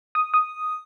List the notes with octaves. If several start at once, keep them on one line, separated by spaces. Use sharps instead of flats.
D#6
D#6